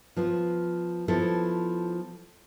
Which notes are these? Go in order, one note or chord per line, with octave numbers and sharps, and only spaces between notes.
F3 B3 F4
F3 B3 E4 A4